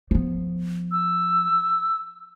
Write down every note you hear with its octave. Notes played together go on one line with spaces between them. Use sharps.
F3 B3
E6